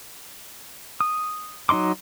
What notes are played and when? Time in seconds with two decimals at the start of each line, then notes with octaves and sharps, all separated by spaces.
1.01 D#6
1.69 F#3 D#4 D#5 C6 D6